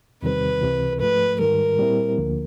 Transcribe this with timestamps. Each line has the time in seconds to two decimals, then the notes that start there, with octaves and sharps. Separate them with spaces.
0.22 E2 C3 D#3 G3 C4 B4
0.62 C#2 C3 E3
1.00 G#2 F3 A3 B4
1.39 G#2 D#3 G3 A#4
1.79 A#2 G3 C4 E4
2.18 D2 D3 F3 A#3